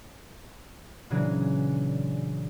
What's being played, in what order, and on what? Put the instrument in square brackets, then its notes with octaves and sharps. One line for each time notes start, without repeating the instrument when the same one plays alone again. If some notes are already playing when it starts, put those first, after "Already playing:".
[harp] A#2 C#3 E3 F#3 D4 G#4